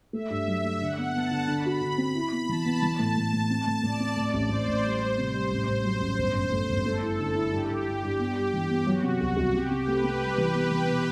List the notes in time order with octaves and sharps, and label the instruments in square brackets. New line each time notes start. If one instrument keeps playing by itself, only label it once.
[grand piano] A3 [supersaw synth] E5
[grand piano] G2
F#3
A3
[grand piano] D3 [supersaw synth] F#5
[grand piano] B3
[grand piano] B3 [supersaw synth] A5
[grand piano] D3
[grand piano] D3 [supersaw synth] B5
[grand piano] F#4
D3
C4
E4
B3
[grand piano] E3 [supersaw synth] A5
[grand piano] B3
E3
A2
[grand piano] A2 [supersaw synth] A5
[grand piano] A2
C4
A2
[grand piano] A2 [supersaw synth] D5
[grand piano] C4
A2
A1
[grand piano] A1 [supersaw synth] C5
[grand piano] A1
G3
G3
[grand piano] C3 [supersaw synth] C5
[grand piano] G3
A1
A1
[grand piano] F#3 [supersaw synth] C5
[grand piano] A1
G1
F#2
A3
G1
[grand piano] A3 [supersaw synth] A4
[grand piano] E4
D3
E4
[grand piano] G2 [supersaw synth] G4
[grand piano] G2
G2
G2
B3
G3
[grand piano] E3 [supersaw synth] G4
[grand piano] B3
[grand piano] F#3 [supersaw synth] F#4
[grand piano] C3
C2
C2
[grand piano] C3 [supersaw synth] G4
[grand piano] C3
[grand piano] A3 [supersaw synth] B4
[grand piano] C3
G3
E3
B3
E3
B2